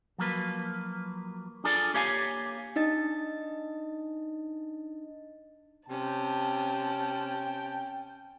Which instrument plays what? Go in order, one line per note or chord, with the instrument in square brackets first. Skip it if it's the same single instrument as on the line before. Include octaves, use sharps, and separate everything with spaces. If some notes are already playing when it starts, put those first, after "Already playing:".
[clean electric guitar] F3 F#3 A#3 B4
D4 F4 G#4 A4 D5
A#3 G4 C#5 F5 F#5 G#5
[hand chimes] D4 D#4 D#5 A6
[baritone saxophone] C3 [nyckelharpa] C#4 [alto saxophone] G5 [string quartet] A5